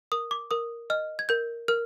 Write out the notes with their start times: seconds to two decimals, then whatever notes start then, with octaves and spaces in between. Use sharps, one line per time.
0.12 A#4 D#6
0.31 D6
0.51 A#4 D#6
0.90 D#5 F6
1.19 G#6
1.29 A#4 G6
1.68 A#4 F6